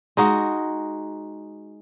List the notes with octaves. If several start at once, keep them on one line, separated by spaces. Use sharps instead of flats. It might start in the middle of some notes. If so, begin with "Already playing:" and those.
G#3 D#4 F#4